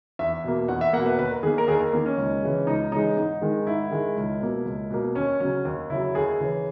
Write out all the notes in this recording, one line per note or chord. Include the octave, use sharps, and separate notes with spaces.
E2 E5
B2 A#3
E2 F#5
E5
B2 A#3 F#5
B4
D#2 B4
A#4
D#3 A#3 G#4
A#4
D#2 G#4
A#4
D#3 A#3
C#4
C#2
C#3 E3 G#3
C#2 D#4
C#3 E3 G#3 D#4
G#2 D#4
D#3 G#3
G#2 E4
D#3 G#3
C#2
B2 A#3
C#2
B2 A#3
D#2 C#4
C#3 F#3 C#4
D#2
C#3 F#3 E4
D#2 G#4
C#3 E3